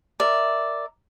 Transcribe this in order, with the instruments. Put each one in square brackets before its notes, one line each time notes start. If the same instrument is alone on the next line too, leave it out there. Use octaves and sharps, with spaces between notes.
[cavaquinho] A#4 D5 E5